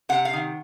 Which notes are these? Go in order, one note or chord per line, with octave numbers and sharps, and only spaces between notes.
C3 F#5
F5
D#3